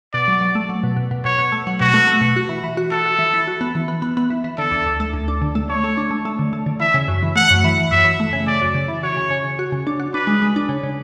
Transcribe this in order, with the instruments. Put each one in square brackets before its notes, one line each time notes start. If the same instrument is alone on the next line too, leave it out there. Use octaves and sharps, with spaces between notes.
[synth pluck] B2 [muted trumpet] D5
[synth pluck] F#3
F#3
A3
F#3
B2
B2
B2
[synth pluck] B2 [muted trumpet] C#5
[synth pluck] B2
A3
F#3
[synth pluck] B2 [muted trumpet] F#4
[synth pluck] A3
A3
B2
F#4
E3
E3
F#4
[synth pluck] F#4 [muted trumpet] A4
[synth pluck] F#4
E3
E3
F#4
B3
E3
B3
B3
B3
E3
E3
[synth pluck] D3 [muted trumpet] A4
[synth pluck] D2
D2
A3
D2
D4
D3
A3
[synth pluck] A3 [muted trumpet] C#5
[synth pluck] A3
D4
A3
A3
D3
A3
D3
[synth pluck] E3 [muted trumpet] E5
[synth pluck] C#3
F#2
E3
[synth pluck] A3 [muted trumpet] F#5
[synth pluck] F#2
E3
E3
[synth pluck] F#2 [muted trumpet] E5
[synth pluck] E3
A3
C#3
[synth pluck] C#3 [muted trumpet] D5
[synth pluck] F#2
C#3
E3
[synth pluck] F#4 [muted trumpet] C#5
[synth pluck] C#3
C#3
C#3
F#4
C#3
D4
F#4
[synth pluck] D4 [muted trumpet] B4
[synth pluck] G#3
G#3
D4
C#3
C#3